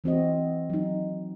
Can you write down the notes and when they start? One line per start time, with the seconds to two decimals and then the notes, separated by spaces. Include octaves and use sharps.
0.04 E3 C4 F#4 D#5
0.70 F#3 D#4